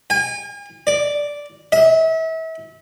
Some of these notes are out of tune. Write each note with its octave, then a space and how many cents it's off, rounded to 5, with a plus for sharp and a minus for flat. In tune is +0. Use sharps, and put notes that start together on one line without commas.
G#5 -40
D5 -5
E5 -35